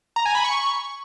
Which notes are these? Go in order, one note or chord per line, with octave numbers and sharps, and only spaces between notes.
A#5
G#5
B5
C#6